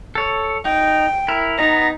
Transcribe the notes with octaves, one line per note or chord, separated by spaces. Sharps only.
A4 C#5
D#4 G5
E4 A#4
B3 D#4 A#5